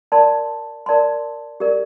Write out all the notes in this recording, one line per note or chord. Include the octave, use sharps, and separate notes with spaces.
A#4 D5 A5 C6
A#4 D5 A5 C6
G4 A#4 D5